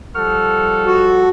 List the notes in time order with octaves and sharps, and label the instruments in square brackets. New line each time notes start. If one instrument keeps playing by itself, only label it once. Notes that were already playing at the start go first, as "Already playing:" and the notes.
[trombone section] F3 G3 A4 [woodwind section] F#5 C#6 F6
[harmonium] F#4